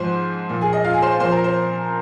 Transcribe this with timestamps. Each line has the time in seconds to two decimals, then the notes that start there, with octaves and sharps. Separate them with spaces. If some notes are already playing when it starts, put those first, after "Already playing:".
Already playing: G#2 F3 C5 C6
0.49 A#2 F3
0.61 G#4 G#5
0.73 D#5
0.84 F4 F5
0.94 G#4 G#5
1.02 C5 C6
1.20 A#2 F3 C5 C6
1.31 A#4 A#5
1.44 C5